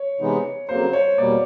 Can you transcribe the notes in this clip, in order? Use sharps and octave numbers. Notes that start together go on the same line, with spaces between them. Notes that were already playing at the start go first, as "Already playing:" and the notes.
Already playing: C#5
C3 E3 G#3 B3 D#4
F2 C#3 F#3 A#3 C5
C#5
E2 B2 G3 A#3 D5